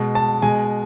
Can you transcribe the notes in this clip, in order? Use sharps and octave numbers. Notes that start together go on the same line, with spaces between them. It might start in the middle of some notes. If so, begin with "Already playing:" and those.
Already playing: B2 G#3
A5
B2 G#3 G#5